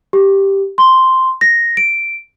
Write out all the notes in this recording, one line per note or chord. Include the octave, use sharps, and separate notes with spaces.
G4
C6
A#6
D7